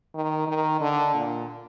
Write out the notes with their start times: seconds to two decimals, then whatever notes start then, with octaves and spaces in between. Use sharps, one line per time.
0.14 D#3
0.47 D#3
0.80 D3
1.14 A#2